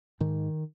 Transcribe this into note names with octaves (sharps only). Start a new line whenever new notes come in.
G#2 D#3